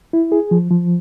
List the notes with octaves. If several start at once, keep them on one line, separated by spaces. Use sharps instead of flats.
E4
G#4
F3
F3